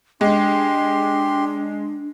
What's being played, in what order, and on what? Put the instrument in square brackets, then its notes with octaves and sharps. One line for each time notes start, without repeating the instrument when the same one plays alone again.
[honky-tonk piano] G#3 [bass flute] D4 [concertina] G4 C6